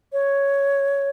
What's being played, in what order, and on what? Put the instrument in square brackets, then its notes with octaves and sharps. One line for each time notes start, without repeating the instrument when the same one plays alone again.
[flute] C#5